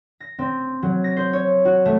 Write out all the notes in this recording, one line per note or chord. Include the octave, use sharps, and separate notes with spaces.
A#6
C4
F#3
A#6
C5
C#5
F#4
A3